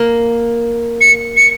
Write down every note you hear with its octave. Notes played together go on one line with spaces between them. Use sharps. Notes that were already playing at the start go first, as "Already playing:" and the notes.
Already playing: A#3
C#7
C#7